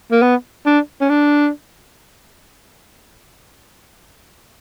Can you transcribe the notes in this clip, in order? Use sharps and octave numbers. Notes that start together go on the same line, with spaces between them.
A#3
B3
D4
C#4
D4